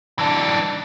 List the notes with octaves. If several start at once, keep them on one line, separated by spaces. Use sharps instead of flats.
E3 D4